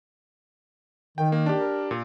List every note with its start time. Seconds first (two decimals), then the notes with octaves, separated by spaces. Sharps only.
1.18 D#3 G5
1.32 A#3
1.46 D4 G4
1.59 A#4
1.91 A#2